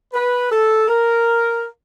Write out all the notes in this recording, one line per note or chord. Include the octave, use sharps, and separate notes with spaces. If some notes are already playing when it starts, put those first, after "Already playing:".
B4
A4
A#4